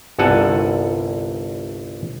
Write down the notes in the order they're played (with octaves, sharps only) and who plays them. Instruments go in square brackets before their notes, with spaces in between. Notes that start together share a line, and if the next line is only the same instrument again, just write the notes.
[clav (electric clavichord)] G1 C2 A4 F#5 G#5 A5